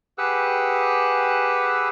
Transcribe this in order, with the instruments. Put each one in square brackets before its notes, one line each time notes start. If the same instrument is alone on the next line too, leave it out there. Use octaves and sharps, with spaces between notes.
[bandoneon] G4 G#4 B4 F#5 E6 F#6